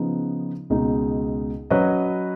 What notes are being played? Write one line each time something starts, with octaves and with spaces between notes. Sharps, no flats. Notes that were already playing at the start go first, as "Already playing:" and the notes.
Already playing: C#3 F3 B3 D#4
C#2 B2 G#3 D#4
F#3 C#4 F#4 B4 D#5